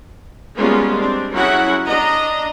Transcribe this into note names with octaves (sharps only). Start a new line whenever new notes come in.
G3 G#3 A#3 B3 C#4 F4
C4 D4
F#3 C#4 E4 F#4 G#4 F#5
D4 D#5 A#5